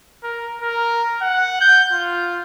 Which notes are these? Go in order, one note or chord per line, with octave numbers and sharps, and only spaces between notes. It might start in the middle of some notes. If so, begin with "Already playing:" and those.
A#4
A#4
F#5
G6
F4